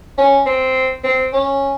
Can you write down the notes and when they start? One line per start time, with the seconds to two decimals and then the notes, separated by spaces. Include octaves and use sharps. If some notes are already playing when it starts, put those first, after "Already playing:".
0.18 C#4
0.46 C4
1.04 C4
1.33 C#4